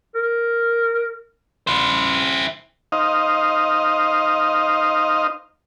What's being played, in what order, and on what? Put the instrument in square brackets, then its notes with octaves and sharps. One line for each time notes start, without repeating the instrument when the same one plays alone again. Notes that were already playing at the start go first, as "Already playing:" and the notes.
[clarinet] A#4
[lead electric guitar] E4 C5
[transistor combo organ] D#4 C5 D#5 F5